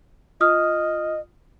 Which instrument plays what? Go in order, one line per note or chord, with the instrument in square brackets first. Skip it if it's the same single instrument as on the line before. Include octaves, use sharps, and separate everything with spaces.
[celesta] F4 D#6 F6 [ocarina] D#5